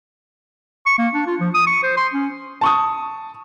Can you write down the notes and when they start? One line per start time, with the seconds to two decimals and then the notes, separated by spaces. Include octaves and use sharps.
0.87 C#6
0.98 A#3
1.13 D4
1.27 F4
1.40 F3
1.54 D#6
1.67 C#6
1.83 C5
1.97 C6
2.13 C#4
2.61 A5 C#6 D#6